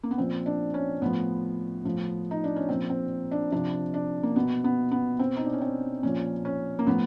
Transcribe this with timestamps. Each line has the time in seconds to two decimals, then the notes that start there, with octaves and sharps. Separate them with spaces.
0.03 A#3
0.11 B3
0.18 A#2 F3 C4
0.46 D4
0.74 C#4
1.02 A2 F3 B3
1.85 A2 F3
2.31 D#4
2.44 D4
2.56 C#4
2.69 A#2 F3 C4
2.90 C4
3.31 D4
3.52 C3 F3 D4
3.94 D4
4.23 A#3
4.36 B2 B3
4.64 B3
4.91 B3
5.19 B2 C4
5.36 D#4
5.45 D4
5.53 C#4
5.61 C4
6.03 A#2 F3 C#4
6.45 C#4
6.79 A#3
6.87 A2 F3 B3